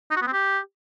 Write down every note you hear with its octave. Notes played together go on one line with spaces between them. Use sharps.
D#4
F#4
B3
C4
G4